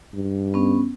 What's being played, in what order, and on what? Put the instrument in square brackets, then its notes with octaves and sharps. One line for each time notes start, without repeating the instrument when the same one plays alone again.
[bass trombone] G2
[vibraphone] B3 C#4